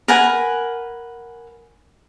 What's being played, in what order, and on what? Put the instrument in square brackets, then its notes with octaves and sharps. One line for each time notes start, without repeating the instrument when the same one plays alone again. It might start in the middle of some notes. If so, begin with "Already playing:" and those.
[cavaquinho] A#4 B4 F#5 G#5